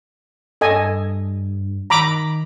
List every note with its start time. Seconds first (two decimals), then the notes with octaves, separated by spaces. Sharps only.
0.61 G2 A4 D#5 G#5
1.90 D#3 A#5 B5 D6